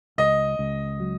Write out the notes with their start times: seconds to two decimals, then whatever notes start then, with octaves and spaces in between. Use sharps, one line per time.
0.18 C#2 D#5
0.59 C#2
1.00 F#3